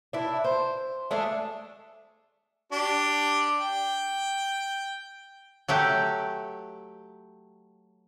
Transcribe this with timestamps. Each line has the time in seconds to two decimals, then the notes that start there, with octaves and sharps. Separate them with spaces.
0.13 D4 E4
0.44 C5
1.11 G#3 A3 D4
2.72 D4 G4
3.61 G5
5.68 F#3 A3 G4